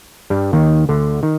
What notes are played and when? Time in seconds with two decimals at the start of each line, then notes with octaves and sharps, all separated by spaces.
0.30 G2 G3
0.53 D#2 D#3
0.89 D2 D3
1.23 D#3